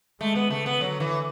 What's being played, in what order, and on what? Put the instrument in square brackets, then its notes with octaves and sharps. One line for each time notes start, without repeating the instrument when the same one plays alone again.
[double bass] G#3 [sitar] A3
[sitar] B3
[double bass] C#3 [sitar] A3
[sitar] B3
[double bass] D3 [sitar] F#3
[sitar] E3